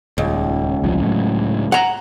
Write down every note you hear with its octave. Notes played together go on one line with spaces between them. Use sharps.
D#1 C#2
D#1 C2 F3
A2 F#3
F#5 A#5